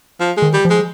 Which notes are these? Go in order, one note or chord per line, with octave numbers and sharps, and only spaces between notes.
F3
G#3
D#3
G3
F3
G#3